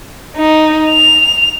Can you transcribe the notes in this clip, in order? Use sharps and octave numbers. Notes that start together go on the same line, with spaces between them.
D#4
F7